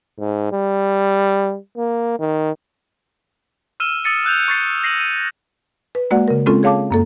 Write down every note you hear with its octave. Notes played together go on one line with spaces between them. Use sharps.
G#2
G3
A#3
D#3
E6 F6 D#7 E7 G7
D#6 E6 A6 C#7 D#7
E6 F#6 G6 F7
C#6 A6 C7
A#6 C7 D#7 F#7
D#7
B4
G#3 A#3 F#4 D5 F#5
C#3 A#4
G#3 C4 C#4 F4 A4
G#4 C#5 F5 A5 D6
F#2 A#3 A4